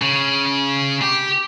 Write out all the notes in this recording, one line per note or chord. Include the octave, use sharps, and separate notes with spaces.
C#3
G4